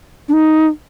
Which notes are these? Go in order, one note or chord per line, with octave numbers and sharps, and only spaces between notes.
D4
D#4